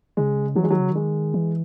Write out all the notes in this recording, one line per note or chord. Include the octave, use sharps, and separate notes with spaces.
C#3 G#3
E3 F#3
G#3
D#3 F#3
C#3
D#3 G#3
E3